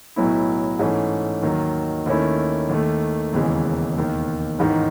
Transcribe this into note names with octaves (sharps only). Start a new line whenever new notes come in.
B1 A2 F#3 B3 E4
G#2 E3 A3 C#4
D#2 D#3 F#3
D#2 D#3 A3 C#4 E4
D#2 D#3 A3
E1 D#2 C#3 E3 G#3
E1 D#2 D#3
A1 G#2 D#3